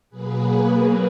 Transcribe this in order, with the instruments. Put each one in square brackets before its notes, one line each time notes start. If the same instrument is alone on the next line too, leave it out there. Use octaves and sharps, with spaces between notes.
[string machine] B2 F#3 A#3 G#4 B4